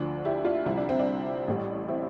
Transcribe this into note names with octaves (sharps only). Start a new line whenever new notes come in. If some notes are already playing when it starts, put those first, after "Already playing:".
Already playing: D2 D3 F3 D4
E4 G4
D4 F4
C2 C3 F3 E4
D4
C4
D4
A1 A2 G3
C4 E4